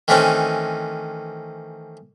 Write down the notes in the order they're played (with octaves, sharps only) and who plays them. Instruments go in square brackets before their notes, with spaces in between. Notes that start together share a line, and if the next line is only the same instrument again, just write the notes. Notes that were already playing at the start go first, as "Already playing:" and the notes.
[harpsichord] D#3 E3 A3 C4 C#4 D#4